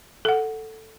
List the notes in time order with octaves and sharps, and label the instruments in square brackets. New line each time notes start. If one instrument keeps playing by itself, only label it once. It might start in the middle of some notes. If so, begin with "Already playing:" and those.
[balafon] A4 F#5